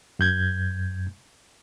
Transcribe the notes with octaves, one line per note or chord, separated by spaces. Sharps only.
F#2 G6 G#6